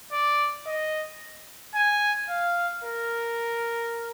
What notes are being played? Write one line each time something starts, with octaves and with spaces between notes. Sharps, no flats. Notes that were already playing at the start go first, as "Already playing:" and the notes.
D5
D#5
G#5
F5
A#4